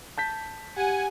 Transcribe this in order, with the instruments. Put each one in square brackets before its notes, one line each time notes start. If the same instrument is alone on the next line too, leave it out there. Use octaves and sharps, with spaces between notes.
[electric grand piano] A5 G6 B6
[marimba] G4 [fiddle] F#5 [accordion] G#5